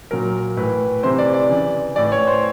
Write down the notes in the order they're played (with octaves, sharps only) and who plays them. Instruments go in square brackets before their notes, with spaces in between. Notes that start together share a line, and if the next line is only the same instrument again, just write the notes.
[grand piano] A#2 F#3 A#4
A2 E3 B4
C3 E3 C5
D5
D5
C#3 E3
A2 E3 D5
C#5
C5